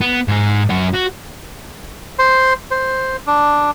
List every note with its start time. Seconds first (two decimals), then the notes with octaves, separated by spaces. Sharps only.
0.01 B3
0.28 G#2 G#4
0.70 F#2 F#5
0.94 F#4
2.19 C5 C6
2.71 C5
3.27 D4